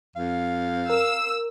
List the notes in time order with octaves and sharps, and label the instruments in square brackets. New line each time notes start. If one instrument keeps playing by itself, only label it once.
[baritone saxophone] F2 [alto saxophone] F5
[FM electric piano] A#4 [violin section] E6